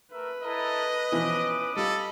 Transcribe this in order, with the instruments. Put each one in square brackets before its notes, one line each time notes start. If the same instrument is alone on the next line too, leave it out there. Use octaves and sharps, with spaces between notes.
[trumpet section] A3 A#4 E5 [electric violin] B4
[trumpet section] E4 A4 A#4 [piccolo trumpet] D#5
[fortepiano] B2 E3 F3 [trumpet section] C#4 D6 D#6
[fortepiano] G3 F4 [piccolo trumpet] A4 [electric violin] D#5 B5